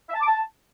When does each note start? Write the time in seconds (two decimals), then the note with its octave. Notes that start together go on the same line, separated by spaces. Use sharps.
0.09 E5
0.15 A5
0.20 D6
0.26 A5